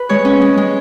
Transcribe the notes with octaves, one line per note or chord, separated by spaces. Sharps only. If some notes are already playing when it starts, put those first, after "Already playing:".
Already playing: B4
G#3 C#5
C#4
G#3
G#3